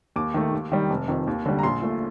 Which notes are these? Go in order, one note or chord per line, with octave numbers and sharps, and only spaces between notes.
D#2 D6
D#3 A3
D#2
D#3 G3
F1
F2 D#3
D#2
D3 G3
A#5
A#1 C6
A#2 A3